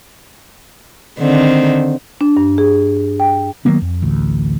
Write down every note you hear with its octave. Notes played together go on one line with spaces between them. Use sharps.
D3 D#3 C4
D4
G2
G#4
G5
D#3 F#3 A#3 B3
F2
A1 D2